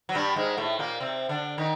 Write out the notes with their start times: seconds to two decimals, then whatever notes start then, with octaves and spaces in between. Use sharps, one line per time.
0.09 F#3
0.15 G2 G3
0.36 G#2 G#3
0.57 A2 A3
0.79 A#2 A#3
1.00 C3 C4
1.29 D3 D4
1.58 D#3 D#4